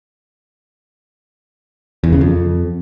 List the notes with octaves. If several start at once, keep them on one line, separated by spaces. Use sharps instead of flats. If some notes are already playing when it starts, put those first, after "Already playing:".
E2
C#3
F2